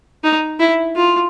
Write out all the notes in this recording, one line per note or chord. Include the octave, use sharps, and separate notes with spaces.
D#4
E4
F4